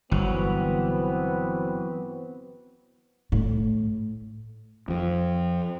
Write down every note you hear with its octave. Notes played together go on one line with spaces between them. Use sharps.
G1 E3 F#3 B3 C4
A2
F2 F3